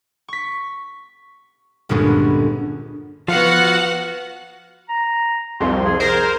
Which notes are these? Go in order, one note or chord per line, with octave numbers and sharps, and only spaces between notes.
C#6 B6
G1 D2 A#2 G#3 B3 C#4
F3 B3 F#4 F5 F#5
A#5
C2 F2 C6
G#4
G#4 A#4 C5